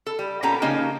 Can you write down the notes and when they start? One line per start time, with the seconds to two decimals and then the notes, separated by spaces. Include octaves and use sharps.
0.07 A4
0.19 G3
0.43 A#2 B3 C#4 G4 A4 A#5
0.62 C#3 F3 A#3 C#4 D#4 G4